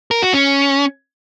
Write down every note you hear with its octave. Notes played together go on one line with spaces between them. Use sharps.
A#4
F#4
C#4